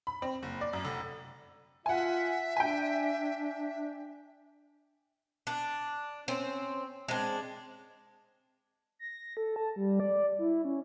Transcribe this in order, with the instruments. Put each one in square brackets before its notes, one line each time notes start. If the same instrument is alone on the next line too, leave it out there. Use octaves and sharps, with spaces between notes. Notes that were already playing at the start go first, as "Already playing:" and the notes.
[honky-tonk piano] B5
C4
F#1
D5
F#2
F1
[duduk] F4 [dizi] E5 [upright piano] F#5 G#5
[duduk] D4 [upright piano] G5 G#5
[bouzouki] D4
[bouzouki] C4 [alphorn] C#4
[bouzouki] G#3 D4 [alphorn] C4
[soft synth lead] A#6
A4
A5
G3
D5
E4
C#4